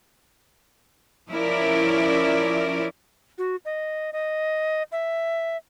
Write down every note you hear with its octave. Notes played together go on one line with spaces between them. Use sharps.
F3 C#4 E4 A#4 D5
F#4
D#5
D#5
E5